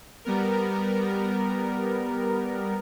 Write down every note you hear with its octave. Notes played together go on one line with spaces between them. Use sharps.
G3 B3 A#4